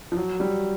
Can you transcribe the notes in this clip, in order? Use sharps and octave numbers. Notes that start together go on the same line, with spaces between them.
F3
F#3
G3